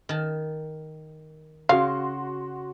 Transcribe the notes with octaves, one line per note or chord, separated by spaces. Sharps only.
D#3 A5
C#3 F#4 F5 C6